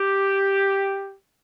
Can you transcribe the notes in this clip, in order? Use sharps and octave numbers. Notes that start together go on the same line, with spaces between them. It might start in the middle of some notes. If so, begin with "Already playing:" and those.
Already playing: G4